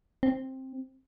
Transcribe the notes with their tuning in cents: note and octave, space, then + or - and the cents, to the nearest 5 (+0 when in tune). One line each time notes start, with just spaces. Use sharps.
C4 +10